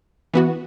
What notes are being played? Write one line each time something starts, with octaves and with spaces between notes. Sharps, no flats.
E3 B3 F#4